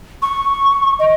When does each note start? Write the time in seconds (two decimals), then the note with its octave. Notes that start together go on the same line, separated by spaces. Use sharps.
0.22 C#6
0.99 D#5